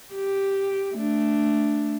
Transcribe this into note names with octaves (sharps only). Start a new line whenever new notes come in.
G4
A3 D4